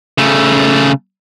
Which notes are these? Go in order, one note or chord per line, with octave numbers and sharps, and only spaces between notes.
C#3 A3